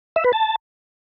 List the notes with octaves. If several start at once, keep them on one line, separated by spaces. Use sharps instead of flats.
E5
B4
A5